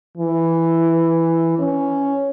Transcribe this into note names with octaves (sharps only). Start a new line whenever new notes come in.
E3
C#4